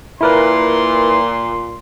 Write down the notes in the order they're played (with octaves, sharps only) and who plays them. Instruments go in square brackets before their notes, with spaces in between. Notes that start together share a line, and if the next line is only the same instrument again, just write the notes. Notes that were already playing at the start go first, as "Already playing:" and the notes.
[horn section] A#2 C6 [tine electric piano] E4 A#4 B4